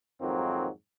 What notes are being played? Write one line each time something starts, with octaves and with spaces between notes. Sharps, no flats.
F2 G#2 D#3 F#3 A#3 C4